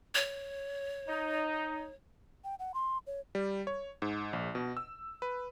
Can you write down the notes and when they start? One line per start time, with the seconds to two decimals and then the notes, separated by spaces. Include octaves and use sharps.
0.15 C#5
1.08 D#4
2.44 G5
2.59 F#5
2.74 C6
3.07 C#5
3.35 G3
3.67 C#5
4.02 G#2
4.33 A#1
4.55 B2
4.77 E6
5.22 B4